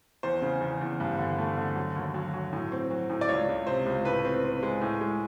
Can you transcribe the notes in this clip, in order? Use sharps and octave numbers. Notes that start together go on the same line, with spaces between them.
E2 C5
C#3
E2
E2
G2
D3
A3
D3
F#3
D#2
F#3
F#3
A2
C4
F#3
A2
D5
C#2 C#5
C#2
C3 C5
C#2
A2 B4
C4
C4
G#3
A2
G#3